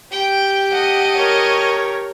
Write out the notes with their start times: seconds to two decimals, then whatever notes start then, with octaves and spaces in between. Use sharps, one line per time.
0.12 G4 G5
0.72 A4 D#5 F#5
1.16 A#4 C#5